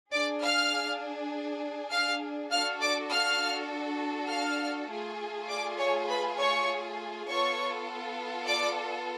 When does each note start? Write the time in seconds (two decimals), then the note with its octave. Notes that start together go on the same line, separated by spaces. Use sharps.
0.13 D4 G#4 D5 D6
0.42 F5 F6
1.91 F5 F6
2.51 D4 F#4 A4 F5 F6
2.81 D5 D6
3.11 F5 F6
4.30 F5 F6
4.89 A3 F4 G#4
5.49 D5 D6
5.78 C#5 C#6
6.09 B4 B5
6.38 C#5 C#6
7.28 B3 F4 A4 C#5 C#6
8.47 D5 D6